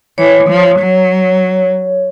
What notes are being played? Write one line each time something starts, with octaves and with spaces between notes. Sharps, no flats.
E3 C#5
F3
F#3